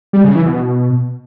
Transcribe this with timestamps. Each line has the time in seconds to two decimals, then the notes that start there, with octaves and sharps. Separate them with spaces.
0.13 G3
0.24 C#3
0.35 E3
0.46 B2